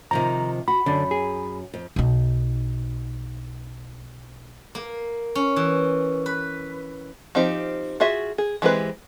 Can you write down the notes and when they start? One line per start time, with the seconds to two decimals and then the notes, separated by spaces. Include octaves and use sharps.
0.11 C3 D#3 F3 A#5
0.68 F#4 B5
0.86 F#2 D3 D4
1.11 G#4
1.74 F2
1.96 B1 D#4
4.75 A#3
5.35 C#4
5.56 E3
6.26 B4
7.35 F3 C4 D#4 G4
8.00 F4 F#4 G#4 E5
8.38 G#4
8.62 E3 G#3 C4 G4 B4